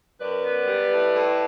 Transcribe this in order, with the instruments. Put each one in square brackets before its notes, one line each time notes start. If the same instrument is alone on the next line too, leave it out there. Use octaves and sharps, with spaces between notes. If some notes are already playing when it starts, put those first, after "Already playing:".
[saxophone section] F#2 B4 D5
B3
G3
A2
A2